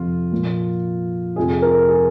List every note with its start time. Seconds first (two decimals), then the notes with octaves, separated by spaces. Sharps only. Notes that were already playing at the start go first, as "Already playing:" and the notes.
Already playing: F2 C3 F3 F4
0.32 A#2 F3
1.36 F2 C3 F3 G#4
1.62 A#4
1.89 G#4